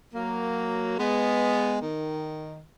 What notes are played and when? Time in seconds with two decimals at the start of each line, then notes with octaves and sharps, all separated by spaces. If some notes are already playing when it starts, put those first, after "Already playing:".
0.14 F#3 A#3
0.98 G#3 B3
1.81 D#3